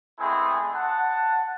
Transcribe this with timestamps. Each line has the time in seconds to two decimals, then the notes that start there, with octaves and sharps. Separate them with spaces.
0.19 G#3 A3 B3 C4 E4 G#4
0.75 F#5 A5